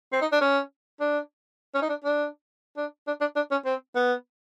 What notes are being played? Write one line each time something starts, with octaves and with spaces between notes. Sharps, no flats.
C4
D#4
D4
C#4
D4
C#4
D#4
D4
D4
D4
D4
D4
D4
C#4
C4
B3